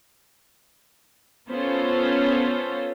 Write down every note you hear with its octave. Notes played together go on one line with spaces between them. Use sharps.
B3 C#4 F4 A4 C5 C#5